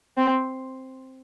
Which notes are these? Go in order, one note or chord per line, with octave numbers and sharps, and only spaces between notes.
C4